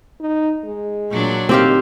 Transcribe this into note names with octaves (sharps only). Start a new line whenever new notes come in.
D#4
G#3
A#2 F#3 D4
D#3 C4 G4 F5